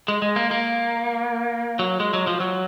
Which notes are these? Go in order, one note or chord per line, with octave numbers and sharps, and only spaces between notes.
G#3
G#3
A#3
A#3
F#3
G#3
F#3
F3
F#3